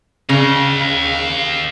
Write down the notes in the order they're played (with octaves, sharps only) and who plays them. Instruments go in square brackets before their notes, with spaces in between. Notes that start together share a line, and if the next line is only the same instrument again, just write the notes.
[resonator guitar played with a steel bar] C#3 [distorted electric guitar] D#5 F5